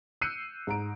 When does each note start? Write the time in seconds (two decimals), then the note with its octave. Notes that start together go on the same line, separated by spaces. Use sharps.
0.21 E6 F#6 G6 C7 C#7 D#7
0.67 G#2 A#5 D7